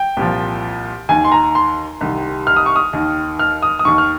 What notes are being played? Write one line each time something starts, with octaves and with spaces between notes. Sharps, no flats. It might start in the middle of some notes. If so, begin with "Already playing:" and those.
Already playing: G5
C2 A#2 F3
D#2 D#3 G#5
C6
A#5
C6
C2 C3 D#3
F6
D#6
C#6
D#6
D#2 D#3
F6
D#6
D#6
D#2 D#3 C#6
F6